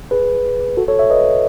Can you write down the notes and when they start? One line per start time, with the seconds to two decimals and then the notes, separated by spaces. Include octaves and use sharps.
0.11 G#4 B4
0.77 F#4 A4
0.88 A4 C#5
0.99 C#5 E5
1.10 B4 D#5